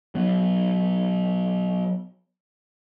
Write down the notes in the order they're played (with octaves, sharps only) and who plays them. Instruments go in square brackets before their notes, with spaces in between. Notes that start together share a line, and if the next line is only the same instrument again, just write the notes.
[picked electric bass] F#3 B3